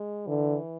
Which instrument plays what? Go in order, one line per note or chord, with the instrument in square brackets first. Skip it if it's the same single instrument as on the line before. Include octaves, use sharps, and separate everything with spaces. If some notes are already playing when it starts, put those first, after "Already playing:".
Already playing: [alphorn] G#3
[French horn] D3 [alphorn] E3